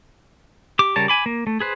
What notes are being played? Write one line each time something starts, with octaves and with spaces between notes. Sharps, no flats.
G4 D6
C#3 G3 A#4 C#5 A5
G#5 B5 D6
A#3
A3
G#4 B4 C5